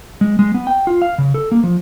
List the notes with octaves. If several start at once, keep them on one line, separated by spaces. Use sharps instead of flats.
G#3
G#3
B3
G5
F4
F5
C#3
A4
A#3
F3